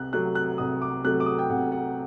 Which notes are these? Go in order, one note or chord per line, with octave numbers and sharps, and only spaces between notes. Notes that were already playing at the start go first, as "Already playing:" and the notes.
Already playing: C2 F#6
C3 F#3 A3 F#6
F#6
C2 D#6
D6
C3 F#3 A3 F#6
D6
D#6
G5
C2 F#5
F#5